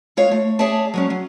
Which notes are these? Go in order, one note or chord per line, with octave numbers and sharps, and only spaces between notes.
G#3 F4 C#5 F5
A3
G#4 C#5 D5 E5 A5
F#3 G#3 C#4
F#3